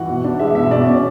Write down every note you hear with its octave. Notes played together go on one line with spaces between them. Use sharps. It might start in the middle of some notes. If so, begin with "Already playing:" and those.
Already playing: E3 F#4 F#5
B2
D4
G#3 E5
B2 E5
B2 D5
C#4